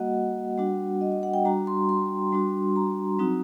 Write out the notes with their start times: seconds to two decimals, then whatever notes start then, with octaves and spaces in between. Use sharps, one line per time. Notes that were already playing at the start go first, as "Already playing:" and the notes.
Already playing: G3 A#3 F#4 D#5 F#5
0.58 G3 D4 F#4
1.01 D#5
1.12 D#5
1.23 F#5
1.34 G5
1.45 G3 D4 F#4 A#5
1.67 C6
1.89 C6
2.32 G3 D4 F#4
2.76 A#5
3.19 F#3 C4 D#4 F#4